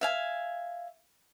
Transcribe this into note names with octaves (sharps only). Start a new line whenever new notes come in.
E5 F5 G#5